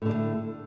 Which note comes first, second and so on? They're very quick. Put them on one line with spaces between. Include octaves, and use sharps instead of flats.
A2 D3 G3 A3